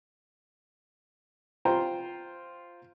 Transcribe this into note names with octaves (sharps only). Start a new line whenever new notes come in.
F4 C5 G5 A#5